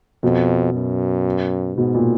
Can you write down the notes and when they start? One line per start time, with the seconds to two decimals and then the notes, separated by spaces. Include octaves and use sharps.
0.23 F2 B2
0.74 F#2
1.77 G#2 B2
1.95 A#2